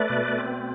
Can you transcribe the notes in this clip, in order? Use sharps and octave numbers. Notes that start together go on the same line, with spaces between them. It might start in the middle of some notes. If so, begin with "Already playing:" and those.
Already playing: A3 B4 D5
B2
C4